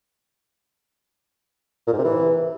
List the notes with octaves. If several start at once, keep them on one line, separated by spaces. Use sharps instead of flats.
A#2
G#2
C3
E3